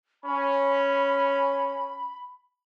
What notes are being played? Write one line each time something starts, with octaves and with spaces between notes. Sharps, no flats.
C#4 B5